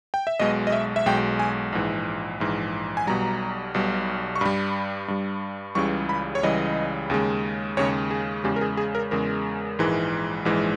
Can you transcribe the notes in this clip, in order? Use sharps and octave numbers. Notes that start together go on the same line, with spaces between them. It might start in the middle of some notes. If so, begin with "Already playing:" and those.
G5
E5
B1 B2 G#3 D#5
D#5
E5
E5
B1 B2 G#3 G5
G#5
A#1 G#2 E3
A#1 G#2 E3
G#5
B1 B2 G3 A#5
B1 B2 G3
C#6
G2 G3 B5
G2 G3
C#2 C#3 E3 G3 C#6
B5
C#5
C#2 C#3 E3 G3 D#5
D#2 C#3 G#3
D#2 C#3 G#3 C#5
G#4
E2 C#3 G#3 G4
A#4
G#4
G#4
A#4
E2 C#3 G#3 A#4
A#1 G#2 E3 G#3
A#1 G#2 E3 G#3